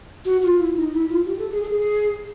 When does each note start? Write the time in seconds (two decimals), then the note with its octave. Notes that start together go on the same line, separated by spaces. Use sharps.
0.25 F#4
0.42 F4
0.58 E4
0.76 D#4
0.92 E4
1.09 F4
1.25 G4
1.38 A4
1.51 G#4
1.63 A4
1.67 G#4